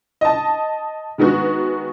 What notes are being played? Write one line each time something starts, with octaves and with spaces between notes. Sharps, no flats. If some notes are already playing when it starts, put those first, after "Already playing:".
D#5 A5
D#3 G#3 B3 F#4